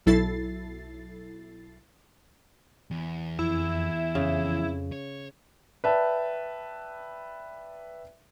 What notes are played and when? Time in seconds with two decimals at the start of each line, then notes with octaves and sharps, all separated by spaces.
0.06 B1 F#3 E4 A4 A6 C7
2.91 E2
3.39 F2 E4
4.15 F2 C#3
4.92 C#5
5.84 B4 D5 E5 G5 A5